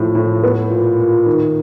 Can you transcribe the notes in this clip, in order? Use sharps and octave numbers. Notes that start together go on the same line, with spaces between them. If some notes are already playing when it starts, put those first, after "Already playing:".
Already playing: A2 F3
A2
B3
A#2
A#2
D#3